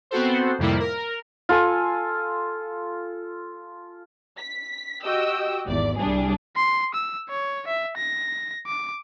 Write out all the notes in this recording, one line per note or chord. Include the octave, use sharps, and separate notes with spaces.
B3 C4 F#4 A4 C5
F2 A2 C3 G3 A#3 E4
A#4
F4 A4 G#5
B6
F#4 G4 D#5 G5 E6
G#1 E2 D5
C2 G3 D4 G#4
C6
E6
C#5
E5
A#6
D6